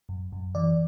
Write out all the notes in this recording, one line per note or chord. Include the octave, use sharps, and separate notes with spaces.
F#2
F#2
E3 D5